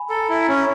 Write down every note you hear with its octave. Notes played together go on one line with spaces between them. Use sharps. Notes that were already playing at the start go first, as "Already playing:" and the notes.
Already playing: G#5 B5
A4 A#5
E4 A#5
C#4